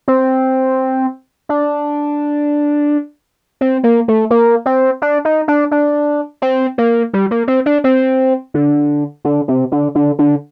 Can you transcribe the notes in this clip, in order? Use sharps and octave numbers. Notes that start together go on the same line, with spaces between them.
C4
D4
C4
A#3
A3
A#3
C4
D4
D#4
D4
D4
C4
A#3
G3
A#3
C4
D4
C4
D3
D3
C3
D3
D3
D3